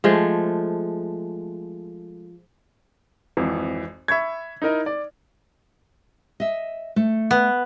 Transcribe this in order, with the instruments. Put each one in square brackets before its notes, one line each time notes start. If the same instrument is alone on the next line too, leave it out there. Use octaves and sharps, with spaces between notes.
[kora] F3 G#3 A3
[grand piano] G#1 F2 E3
E5 B5 C#6 G#6
D#4 E4 A#4 D#5
D5
[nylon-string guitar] D#5 E5
A3
[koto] B3